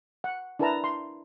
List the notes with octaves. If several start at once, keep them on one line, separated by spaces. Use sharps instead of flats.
F#5
D4 E4 A#4 B4 A5 A#5
C6